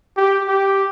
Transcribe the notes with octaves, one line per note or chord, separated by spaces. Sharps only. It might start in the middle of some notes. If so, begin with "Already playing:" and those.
G4
G4